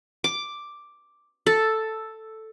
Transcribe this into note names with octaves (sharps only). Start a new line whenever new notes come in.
D6
A4